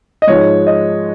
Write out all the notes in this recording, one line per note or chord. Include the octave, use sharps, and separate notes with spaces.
D#5
G#2 F3 G#3 C#5
D#5